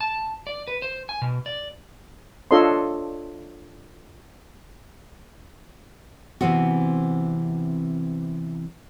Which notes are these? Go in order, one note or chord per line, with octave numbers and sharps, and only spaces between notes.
A5
D5
B4
C5
G#5
B2
D5
D4 F4 A4 C#5 D#5 C6
C3 E3 B3 C4 F#4